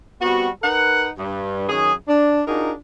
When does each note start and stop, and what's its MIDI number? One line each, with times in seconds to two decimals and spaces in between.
0.21 0.48 55
0.21 0.48 59
0.21 0.48 60
0.21 0.48 66
0.62 1.08 63
0.62 1.08 70
0.62 1.08 71
0.62 1.08 78
1.18 1.69 43
1.69 1.93 42
1.69 1.93 51
1.69 1.93 61
1.69 1.93 68
2.08 2.41 62
2.47 2.72 62
2.47 2.72 63
2.47 2.72 65
2.47 2.72 66
2.47 2.72 68
2.47 2.72 70